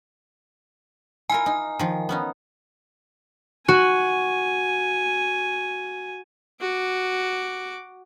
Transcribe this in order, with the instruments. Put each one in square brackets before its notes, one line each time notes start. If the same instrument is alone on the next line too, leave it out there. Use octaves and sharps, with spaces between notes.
[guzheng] E4 F4 A#4 [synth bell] G#5
[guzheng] D#4
D#3 F3
B3 C#4 D#4
[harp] F#4 [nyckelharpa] G#5
[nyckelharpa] F#4 D6